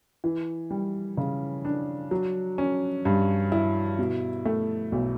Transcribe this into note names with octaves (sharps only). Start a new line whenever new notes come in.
E3
G3
C#3
D4
F#3
C#4
G2
E4
B2
A3
B1